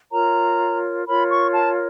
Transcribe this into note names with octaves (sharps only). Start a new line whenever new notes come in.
F4 A#4 C#5 A#5
F4 A#4 C#5 B5
C#6
A5